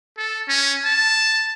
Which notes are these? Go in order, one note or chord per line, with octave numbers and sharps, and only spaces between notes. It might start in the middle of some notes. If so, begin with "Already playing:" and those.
A4
C#4
A5